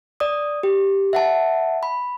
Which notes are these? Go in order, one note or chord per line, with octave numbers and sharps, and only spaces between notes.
D5 D#6
G4
E5 F#5 A5
B5